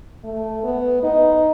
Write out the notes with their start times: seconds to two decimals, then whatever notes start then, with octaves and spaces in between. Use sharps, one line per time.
0.24 A3
0.64 B3
1.03 D#4